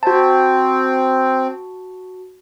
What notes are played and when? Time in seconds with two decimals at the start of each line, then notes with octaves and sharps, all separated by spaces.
0.03 C4 F#4 A5